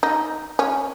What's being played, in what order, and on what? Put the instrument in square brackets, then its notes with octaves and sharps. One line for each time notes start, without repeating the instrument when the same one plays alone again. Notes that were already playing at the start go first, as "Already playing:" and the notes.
[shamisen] D#4
C#4